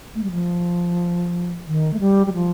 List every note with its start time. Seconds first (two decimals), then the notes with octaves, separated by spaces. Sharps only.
0.15 A3
0.23 G3
0.32 F3
1.67 D#3
1.94 A3
2.00 G3
2.27 G3
2.34 F3